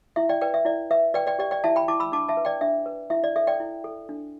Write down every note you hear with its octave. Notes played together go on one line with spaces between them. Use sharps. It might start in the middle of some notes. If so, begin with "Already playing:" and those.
E4 E5
D5 G5
B4 D5 G5
E5
E4 D5
B4 E5
B4 D5 G5
D5 G5
G4 D5 G5
D5 G5
E4 E5 A5
G5 B5
E4 A5 D6
B5 E6
D4 A5 D6
E5 A5
B4
D5 G5
D4 E5
B4
E4 E5
D5
A4 E5
D5 G5
E4
A4
D4